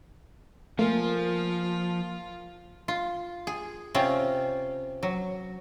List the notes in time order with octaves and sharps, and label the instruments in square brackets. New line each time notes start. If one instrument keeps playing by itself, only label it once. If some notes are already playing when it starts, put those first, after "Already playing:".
[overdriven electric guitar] F3 [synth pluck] A3 [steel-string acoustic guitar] A#3 A#4 G#5 [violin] F4
[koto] F4
G#4
C3 C4 C#4 F4
F#3